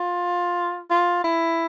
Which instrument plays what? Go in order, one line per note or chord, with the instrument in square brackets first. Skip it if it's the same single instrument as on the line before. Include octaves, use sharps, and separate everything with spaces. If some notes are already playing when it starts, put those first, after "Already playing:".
Already playing: [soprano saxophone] F4
F4
E4